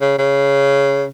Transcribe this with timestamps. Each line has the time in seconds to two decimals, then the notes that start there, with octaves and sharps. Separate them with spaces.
0.01 C#3
0.18 C#3